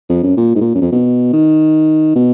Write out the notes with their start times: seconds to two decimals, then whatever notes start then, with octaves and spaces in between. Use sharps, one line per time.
0.09 F2
0.23 F#2
0.37 A#2
0.55 G#2
0.61 A#2
0.74 F#2
0.82 F2
0.92 B2
1.33 D#3
2.15 B2